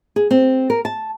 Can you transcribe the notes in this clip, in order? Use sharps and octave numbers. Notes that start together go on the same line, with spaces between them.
G#4
C4
A#4
A5